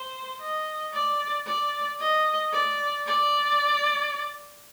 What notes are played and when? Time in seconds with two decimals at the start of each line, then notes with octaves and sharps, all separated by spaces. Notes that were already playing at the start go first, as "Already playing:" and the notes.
Already playing: C5
0.41 D#5
0.94 D5
1.47 D5
2.00 D#5
2.53 D5
3.06 D5